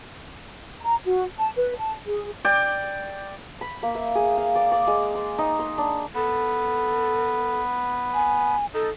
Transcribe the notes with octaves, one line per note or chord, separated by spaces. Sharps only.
A#5
F#4
A5
B4
A5
G#4
D5 G5 D6
B5
A#3
E5
G#4
F5
D5
D5
G#3
C6
D#4
C6
D4
B3 A4
G#5
D#4 A4